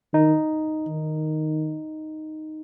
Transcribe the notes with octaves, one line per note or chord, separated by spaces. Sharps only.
D#3 D#4
D#3